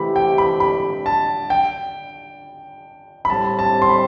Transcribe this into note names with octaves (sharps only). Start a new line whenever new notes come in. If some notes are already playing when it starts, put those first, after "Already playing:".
Already playing: C3 E3 A3 E4 G4 B5
G5
B5
B5
A5
G5
B5
A2 G3 C4 A5
A5
C6
B5